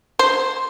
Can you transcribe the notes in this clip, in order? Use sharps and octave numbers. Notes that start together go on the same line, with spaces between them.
C5